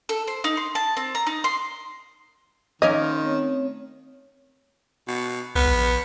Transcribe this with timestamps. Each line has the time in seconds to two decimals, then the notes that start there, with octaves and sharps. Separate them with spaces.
0.09 A4
0.28 C5
0.44 D#4
0.57 C6
0.75 A5
0.97 C4
1.15 A#5
1.27 D#4
1.44 C6
2.82 D#3 A#3 C#4 A#4 D#5
3.01 C6
3.23 A3 C4 C#5
5.08 B2
5.55 C2 B3
5.68 A#1